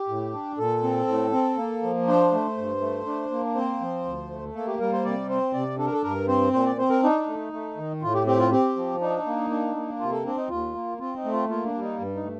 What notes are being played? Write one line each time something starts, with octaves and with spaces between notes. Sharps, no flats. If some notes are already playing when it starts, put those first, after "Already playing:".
Already playing: G4
A2
D4
A#2 A4
C4
A2
C4
A#3
F3
D4 C5
A3
G2
A3
D4
A#3
C4 C5
F3
D2
A3
A#3 A4
G4
G3 A#4
C5
C3 D5
C4 C5
C3 D5
D4 A4
A#4
A4
G2 A#4
C4 C5
A#2 C5
D5
C4 C5
A#4
D4 D#4
A3
A3
D#3
A2 F4
G4
C4 G4
F4
C4 G4
F3
D4 D#4
A#3
D4
A#3
C3 F4
A4
C4 D4
D#4
D#2 F4
A#3
C4 F4
D#4
A3
F4
A#3 F4
D4
G3
D#4
G2
D#4
A3